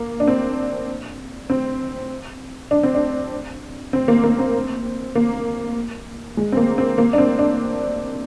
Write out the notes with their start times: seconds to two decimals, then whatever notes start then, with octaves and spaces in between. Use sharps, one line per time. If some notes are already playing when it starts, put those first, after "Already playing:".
Already playing: A#3
0.20 D4
0.28 C4
1.50 C4
2.71 D4
2.83 C4
2.95 D4
3.93 C4
4.08 A#3
4.24 A#3
4.39 C4
5.15 A#3
6.37 G#3
6.52 C4
6.57 A#3
6.78 C4
6.98 A#3
7.13 D4
7.18 C4
7.39 D4